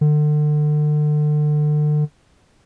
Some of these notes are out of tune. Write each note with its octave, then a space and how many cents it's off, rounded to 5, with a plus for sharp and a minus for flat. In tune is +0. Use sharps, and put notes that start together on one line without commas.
D3 +35